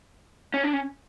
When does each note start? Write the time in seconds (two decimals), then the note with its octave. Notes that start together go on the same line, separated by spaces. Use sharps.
0.54 C#4
0.64 D4
0.73 C#4